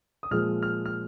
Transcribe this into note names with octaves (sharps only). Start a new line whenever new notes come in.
D#6
A#2 F3 G#3 F6
F6
F6